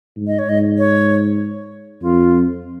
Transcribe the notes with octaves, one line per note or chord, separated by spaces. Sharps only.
G#2
D#5
C#5
G#2 D#5
C#5
F2 F4